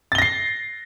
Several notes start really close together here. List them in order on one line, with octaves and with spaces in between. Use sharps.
A6 G7 A#6 C7